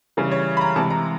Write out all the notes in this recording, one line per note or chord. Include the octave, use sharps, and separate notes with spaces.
C#3 E3 G3
C#5
B5
A#5
C3 E3 G#3 A5
A#5